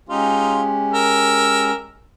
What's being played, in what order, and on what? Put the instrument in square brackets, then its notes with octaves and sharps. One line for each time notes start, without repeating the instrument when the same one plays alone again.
[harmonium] G#3 C#4 G4 [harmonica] D#4 F4
[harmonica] A#4 E6